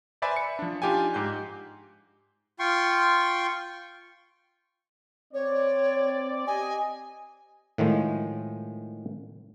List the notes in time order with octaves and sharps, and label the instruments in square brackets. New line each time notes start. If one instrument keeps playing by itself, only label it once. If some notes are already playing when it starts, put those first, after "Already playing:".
[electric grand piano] B4 C5 D5 E5 G#5 B5
C#7
F3 D4
D4 D#4 F4 G4 G5 G#5
G#2 G4 G6
[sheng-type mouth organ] F4 G5 C6 C#6
[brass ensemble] C4 D5 [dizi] C#5
[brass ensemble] G4 D#5 [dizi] G#5
[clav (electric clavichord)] A2 D#3 F3 G#3